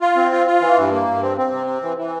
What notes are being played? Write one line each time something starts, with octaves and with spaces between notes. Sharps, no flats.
F4
C4
F4
F4
E3
G2
A#3
G2
C4
C4
C3
C4
E3
E3